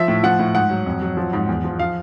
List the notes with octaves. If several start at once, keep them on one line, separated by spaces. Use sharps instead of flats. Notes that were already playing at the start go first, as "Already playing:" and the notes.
Already playing: F3 E5
A2
F3 F#5
A2
G#2 F#5
F#3
F2
F#3
F3
G#2
E2
F3
F3 F5